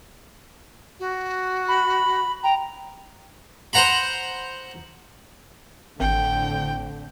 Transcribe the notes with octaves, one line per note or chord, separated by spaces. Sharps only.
F#4
B5
G5 A#5
C5 F#5 A#5 B5
G#1 A2 D3 C4 G5